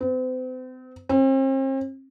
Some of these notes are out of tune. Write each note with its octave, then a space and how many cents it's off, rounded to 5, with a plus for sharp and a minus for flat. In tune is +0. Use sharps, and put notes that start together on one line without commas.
C4 -40
C4 +40